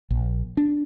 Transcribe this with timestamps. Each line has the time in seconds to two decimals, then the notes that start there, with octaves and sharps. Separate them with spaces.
0.11 A#1
0.57 D4